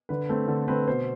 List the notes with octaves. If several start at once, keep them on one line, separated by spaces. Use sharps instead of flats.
D3 B4
A3 C4
D3 A4
A3 C4 B4
B2 C5